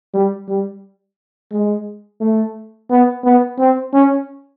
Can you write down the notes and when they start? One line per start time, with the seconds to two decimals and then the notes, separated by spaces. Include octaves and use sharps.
0.14 G3
0.48 G3
1.52 G#3
2.21 A3
2.90 B3
3.24 B3
3.58 C4
3.93 C#4